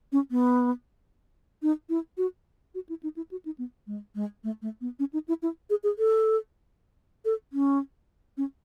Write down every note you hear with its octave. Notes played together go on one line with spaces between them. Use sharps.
C#4
B3
D#4
E4
F#4
F#4
E4
D#4
E4
F#4
D#4
B3
G#3
G#3
A3
A3
B3
C#4
D#4
E4
E4
G#4
G#4
A4
A4
C#4
C#4